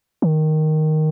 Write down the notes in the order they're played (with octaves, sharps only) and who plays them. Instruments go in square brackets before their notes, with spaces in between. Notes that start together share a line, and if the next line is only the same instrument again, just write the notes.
[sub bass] D#3